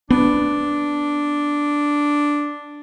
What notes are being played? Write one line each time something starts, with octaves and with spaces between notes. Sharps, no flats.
B3 D4